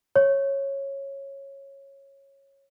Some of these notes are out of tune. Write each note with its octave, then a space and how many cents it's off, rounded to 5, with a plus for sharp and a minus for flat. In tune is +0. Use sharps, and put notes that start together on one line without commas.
C#5 -10